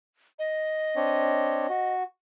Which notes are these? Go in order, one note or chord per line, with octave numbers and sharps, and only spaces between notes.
D#5
C4 D4 C#5
F#4